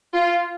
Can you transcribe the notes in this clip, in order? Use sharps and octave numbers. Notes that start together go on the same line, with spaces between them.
F4